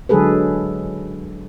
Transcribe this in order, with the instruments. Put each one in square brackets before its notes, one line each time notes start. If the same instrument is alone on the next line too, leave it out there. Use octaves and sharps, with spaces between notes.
[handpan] D3 F#3 G#3 G#4 A4 B4